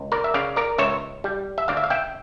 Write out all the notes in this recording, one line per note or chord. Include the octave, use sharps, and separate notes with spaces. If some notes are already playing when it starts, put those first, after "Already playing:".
Already playing: C#2
A#4 D5
E5
C#3 D5 F5
A#4 D5
C#2 C#5 E5
G3
E5
D2 D5 F5
E5
F5
E5 G5